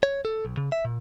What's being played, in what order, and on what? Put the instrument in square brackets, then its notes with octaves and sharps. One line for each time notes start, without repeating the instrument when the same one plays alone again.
[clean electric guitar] C#5
A4
B1
C#3
E5
A#2